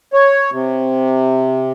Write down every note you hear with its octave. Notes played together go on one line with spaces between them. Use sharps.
C#5
C3